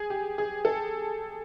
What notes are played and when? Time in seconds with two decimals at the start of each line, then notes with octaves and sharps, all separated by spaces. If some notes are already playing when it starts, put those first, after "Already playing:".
Already playing: G#4
0.10 G4
0.38 G#4
0.65 A4